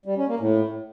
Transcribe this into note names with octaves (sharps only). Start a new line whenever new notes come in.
G3
C#4
A#3
A2